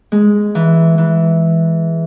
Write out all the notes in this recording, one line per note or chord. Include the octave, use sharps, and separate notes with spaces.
G#3
E3
E3